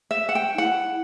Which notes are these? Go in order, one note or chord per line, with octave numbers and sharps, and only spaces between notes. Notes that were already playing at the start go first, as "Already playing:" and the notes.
E5
F#5
G5
D#4
E4 F#5